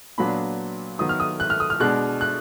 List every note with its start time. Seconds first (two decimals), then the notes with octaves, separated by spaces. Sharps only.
0.18 A#2 F#3 B3 D4 B5
0.99 D#3 F#3 B3 D#6
1.09 F6
1.20 D#6
1.40 F#6
1.50 F6
1.60 D#6
1.70 F6
1.80 B2 G#3 D4 F#6
2.21 F#6